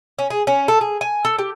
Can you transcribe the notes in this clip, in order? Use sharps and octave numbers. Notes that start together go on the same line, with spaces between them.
C#4
G#4
C#4
A4
G#4
G#5
A4
G4